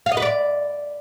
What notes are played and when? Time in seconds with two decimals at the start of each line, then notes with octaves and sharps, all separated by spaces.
0.06 F5
0.12 D#5
0.17 B4
0.22 D5